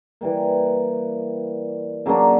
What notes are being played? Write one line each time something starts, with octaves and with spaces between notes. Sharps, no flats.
E3 G3 A#3
C#3 F#3 A#3 D4